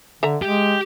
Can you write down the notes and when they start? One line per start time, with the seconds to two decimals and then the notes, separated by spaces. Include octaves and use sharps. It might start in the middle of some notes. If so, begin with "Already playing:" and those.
0.23 D3 A4 E5 A#5
0.42 G#3 G4